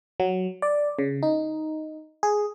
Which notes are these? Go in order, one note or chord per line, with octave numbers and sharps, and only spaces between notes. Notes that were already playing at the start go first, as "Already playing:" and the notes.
F#3
D5
C#3
D#4
G#4